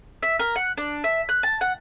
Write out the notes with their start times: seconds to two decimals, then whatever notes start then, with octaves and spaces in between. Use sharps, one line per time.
0.23 E5
0.39 A#4
0.56 F#5
0.77 D4
1.04 E5
1.29 F#6
1.43 A5
1.61 F#5